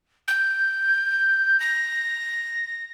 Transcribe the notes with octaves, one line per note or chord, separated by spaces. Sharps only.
G6
A#6